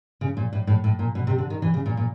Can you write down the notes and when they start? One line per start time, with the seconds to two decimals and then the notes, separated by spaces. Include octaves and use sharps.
0.21 C#3
0.37 A#2
0.53 A2
0.67 A2
0.84 A2
0.99 A#2
1.15 B2
1.27 C3
1.38 D3
1.50 D#3
1.62 E3
1.74 C#3
1.86 A#2
1.97 A#2